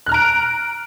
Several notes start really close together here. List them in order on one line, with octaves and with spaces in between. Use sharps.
F#6 F6 A#5 D7